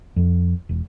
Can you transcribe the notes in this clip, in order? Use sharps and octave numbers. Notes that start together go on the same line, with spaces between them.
F2
E1